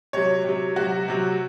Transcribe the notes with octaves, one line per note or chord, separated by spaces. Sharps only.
C3 F#3 C#5
C3 F#3
C3 F#3 F#4
C3 F#3